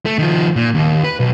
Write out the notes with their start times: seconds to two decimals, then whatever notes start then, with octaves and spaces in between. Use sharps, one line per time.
0.06 A3
0.19 D#3 F3
0.56 A#2
0.75 D#2
1.04 B4
1.20 B1